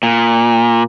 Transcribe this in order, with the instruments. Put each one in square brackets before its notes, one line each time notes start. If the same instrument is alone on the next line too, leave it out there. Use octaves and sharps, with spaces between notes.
[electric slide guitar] A#2